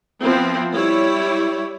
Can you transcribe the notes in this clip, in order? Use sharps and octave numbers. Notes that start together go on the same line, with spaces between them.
F3 B3 C4 E4
G3 E4 C#5